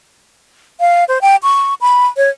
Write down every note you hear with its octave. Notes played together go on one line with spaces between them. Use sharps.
F5
C5
G5
C#6
B5
C#5